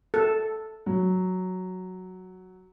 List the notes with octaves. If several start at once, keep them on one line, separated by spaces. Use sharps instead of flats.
A4
F#3